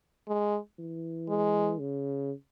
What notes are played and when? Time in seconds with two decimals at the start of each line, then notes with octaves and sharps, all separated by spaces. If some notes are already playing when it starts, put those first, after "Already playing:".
0.28 G#3
0.79 E3
1.29 G#3
1.80 C#3